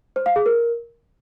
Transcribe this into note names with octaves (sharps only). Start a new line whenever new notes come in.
C5
F5
G#4
A#4